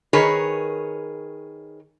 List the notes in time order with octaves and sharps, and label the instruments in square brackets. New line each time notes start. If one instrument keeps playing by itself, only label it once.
[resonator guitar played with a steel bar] D#3 G#4 A#4 B4 C#5